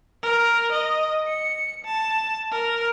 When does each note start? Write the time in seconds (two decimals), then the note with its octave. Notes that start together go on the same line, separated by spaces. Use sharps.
0.23 A#4
0.72 D#5
1.28 C#7
1.85 A5
2.51 A#4